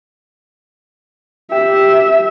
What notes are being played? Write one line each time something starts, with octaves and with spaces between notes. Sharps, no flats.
G4 E5